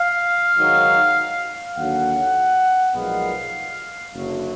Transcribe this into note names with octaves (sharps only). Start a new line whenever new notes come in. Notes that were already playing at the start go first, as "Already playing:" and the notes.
Already playing: F5
G#2 D#3 F#3
D#2 D3 F#3 F#5
B1 A#2 F3 G#3 B3 F5
F#1 F#2 D3 F#3